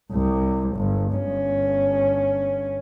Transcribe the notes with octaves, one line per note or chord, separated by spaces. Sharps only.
C2
G1
G1 C#4